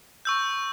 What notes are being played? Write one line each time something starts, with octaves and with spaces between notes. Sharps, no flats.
C#6 E6 G6